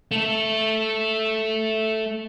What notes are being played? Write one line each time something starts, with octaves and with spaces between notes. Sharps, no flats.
A3 A4